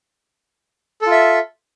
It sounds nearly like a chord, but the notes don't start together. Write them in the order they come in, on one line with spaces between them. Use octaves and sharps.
A4 F4 E5